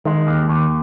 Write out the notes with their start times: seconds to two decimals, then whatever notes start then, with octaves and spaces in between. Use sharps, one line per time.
0.05 D#3 G#3
0.27 D#2
0.49 D#2